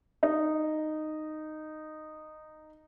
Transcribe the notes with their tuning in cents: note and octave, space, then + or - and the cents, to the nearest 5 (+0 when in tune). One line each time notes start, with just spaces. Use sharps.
D#4 -10